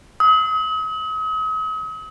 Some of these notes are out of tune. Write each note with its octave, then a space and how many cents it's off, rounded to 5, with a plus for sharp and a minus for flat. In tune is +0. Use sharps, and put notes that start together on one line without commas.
D#6 +40